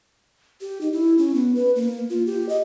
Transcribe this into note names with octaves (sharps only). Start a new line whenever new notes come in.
G4
D#4
E4
C#4
B3
B4
A#3
F4
G4
D#5